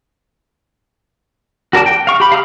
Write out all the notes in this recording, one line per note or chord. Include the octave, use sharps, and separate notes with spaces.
F#4 A#4 D5 A5
G5
F5 C#6
G4 B5
F5 A#5 D#6 F6